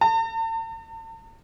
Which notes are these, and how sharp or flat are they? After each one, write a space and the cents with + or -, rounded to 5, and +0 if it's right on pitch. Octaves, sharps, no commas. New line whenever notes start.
A5 +45